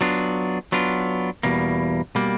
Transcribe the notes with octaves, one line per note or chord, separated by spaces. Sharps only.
F#3 B3 D4 F4
F#3 B3 D4 F4
E2 B2 G3 A#3
B2 G3 A#3